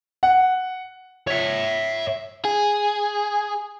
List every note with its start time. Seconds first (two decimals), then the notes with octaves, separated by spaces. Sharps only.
0.23 F#5
1.27 C#5 E5
2.45 G#4